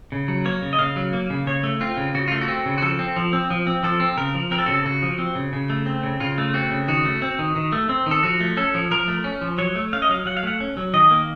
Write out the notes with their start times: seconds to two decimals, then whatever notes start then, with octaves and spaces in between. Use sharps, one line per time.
0.12 C#3
0.28 F#3
0.45 A#3 C#5
0.62 C#3
0.73 D#5
0.79 C#3 F5
0.96 F#3
1.13 A#3
1.30 C#3
1.47 C#3 C#5
1.63 A3
1.81 C4 F4
1.97 C#3
2.14 C#3 F#4
2.28 A3 F4
2.41 F#4
2.48 C4
2.66 C#3
2.78 F#4
2.82 F3 A4
2.99 C4
3.16 F3
3.33 C4
3.50 F3
3.67 C4
3.83 F3 A4
4.00 C4
4.17 C#3 A#4
4.34 F3
4.51 C4 A#4
4.58 A4
4.66 C#3 F#4
4.74 A4
4.85 C#3 F#4
5.03 F3
5.19 C4
5.35 C#3
5.53 C#3
5.70 A3
5.86 C4
6.03 C#3
6.20 C#3 F4
6.38 A3
6.54 C4 F#4
6.71 C#3
6.88 D#3 F#4
7.05 A3
7.22 C4
7.39 D#3
7.56 D#3
7.72 A3
7.89 C4
8.06 D#3
8.11 A4
8.23 F3 F#4
8.41 A3
8.57 C#4 A4
8.74 F3
8.91 F3 A#4
9.08 A3
9.24 C#4
9.41 F3
9.58 F#3 C#5
9.76 A3
9.93 C#4 F5
10.02 D#5
10.09 F#3 F5
10.26 F#3 F#5
10.37 F5
10.43 A3 F#5
10.60 C#4
10.77 F#3
10.94 D#3 D#5
11.11 A#3